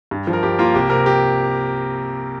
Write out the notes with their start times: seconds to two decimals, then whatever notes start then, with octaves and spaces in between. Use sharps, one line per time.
0.11 G2
0.27 F3
0.33 A#4
0.43 G2 G4
0.59 A#3 F4
0.74 C2 G4
0.90 C3 A#4
1.06 G4